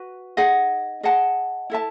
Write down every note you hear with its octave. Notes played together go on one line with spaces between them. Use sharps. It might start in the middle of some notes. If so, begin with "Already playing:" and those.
Already playing: F#4 B4
D#4 G#4 D#5 F#5
G#4 D#5 F#5 A5
E4 A4 E5 A5